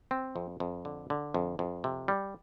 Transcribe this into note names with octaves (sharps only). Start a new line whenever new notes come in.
C4
F2
F2
D3
D3
F2
F2
C3
G3